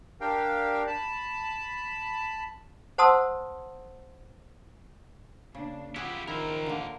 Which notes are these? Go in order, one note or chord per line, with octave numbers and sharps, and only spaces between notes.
D4 G4 A#4 F5 G5
A5 B5
C5 F#5 A5 C6 D#6 E6
C#3 A#3 D4
F3 E4 F4 G4 G#4 F#5
D#3 E4 A#4 C5
D3 A#3